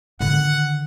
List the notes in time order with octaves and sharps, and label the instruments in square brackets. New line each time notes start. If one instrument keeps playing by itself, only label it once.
[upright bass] D3 D#3 [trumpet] F#5